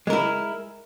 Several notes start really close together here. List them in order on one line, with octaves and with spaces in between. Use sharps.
G#3 A#4 E4